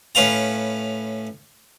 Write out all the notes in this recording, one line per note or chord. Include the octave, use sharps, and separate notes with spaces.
A2 C#4 B4 F5 A#5